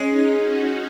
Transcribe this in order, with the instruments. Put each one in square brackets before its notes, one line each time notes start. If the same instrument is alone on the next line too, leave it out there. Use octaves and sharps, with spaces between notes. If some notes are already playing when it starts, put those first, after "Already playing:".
Already playing: [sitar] G#3 [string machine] C#4
[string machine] D#4
F#4